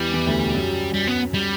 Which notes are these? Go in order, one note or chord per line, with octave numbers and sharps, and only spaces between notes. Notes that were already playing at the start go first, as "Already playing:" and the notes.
Already playing: E2 E3 G3
E2 E3
D2 D3
B2
F#2 F#3
G3
B3
G3